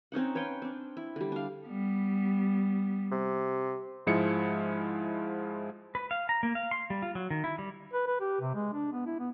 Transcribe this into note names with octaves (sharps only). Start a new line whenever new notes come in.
C4 C#4 D#4 F#5
B4 C#5 F5 G5
C4 D4
E4
D3 G3
D4 F5
G3 B3
C3
G#2 F3 G#3 E4 C#7
B4
F5
A#5
A#3
F5
C6
G3
F4
F#3
D#3
E4
G3
B4
B4
G4
C3
G#3
D4
B3
E4
B3